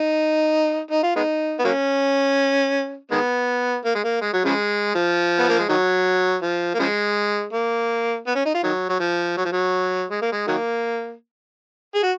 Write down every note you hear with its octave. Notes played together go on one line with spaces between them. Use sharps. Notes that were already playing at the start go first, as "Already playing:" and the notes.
Already playing: D#4
D#4
F4
G#3 B3 D#4
B3
F#3 A#3 C#4
D#3 G#3 B3
A#3
G#3
A#3
G#3
F#3
C#3 F3 G#3
F3
B3
A#3
G#3
D#3 F#3
F3
A#3
C#3 F3 G#3
A#3
B3
C#4
D#4
F4
D#3 F#3
F#3
F3
F#3
F3
F#3
G#3
A#3
G#3
D#3 F#3 A#3
G#4
F#4